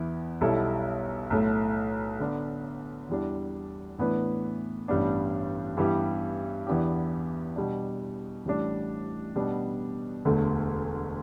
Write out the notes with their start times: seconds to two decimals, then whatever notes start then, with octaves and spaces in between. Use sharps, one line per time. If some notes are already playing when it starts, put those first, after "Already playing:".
Already playing: E2 E3 B3 E4
0.41 B1 B2 G3 E4 A4
1.30 B1 A2 A3
2.19 D3 B3 D4
3.09 E2 E3 G3 D4
3.98 A2 E3 B3 D4 B4
4.88 A1 G2 G3 B3 D4
5.77 G2 E3 G3 B3 G4
6.67 E2 E3 B3 D4 G4
7.56 B2 G3 D4
8.45 A1 A2 G3 D4
9.35 B2 G3 B3 D4
10.25 E1 D2 D3 A3